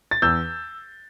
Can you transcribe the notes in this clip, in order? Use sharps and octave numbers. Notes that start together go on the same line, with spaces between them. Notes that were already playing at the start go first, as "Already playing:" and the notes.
A6
E2 E6 G6